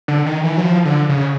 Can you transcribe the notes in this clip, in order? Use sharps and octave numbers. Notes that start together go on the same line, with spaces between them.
D3
D#3
E3
F#3
F3
D3
C#3